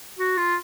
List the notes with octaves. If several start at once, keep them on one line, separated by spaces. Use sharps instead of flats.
F#4
F4